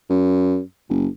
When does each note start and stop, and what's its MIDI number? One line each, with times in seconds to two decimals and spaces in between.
0.10 0.60 42
0.89 1.07 30